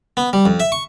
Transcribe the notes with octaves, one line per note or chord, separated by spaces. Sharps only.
B3
G3
F2
E5
C#6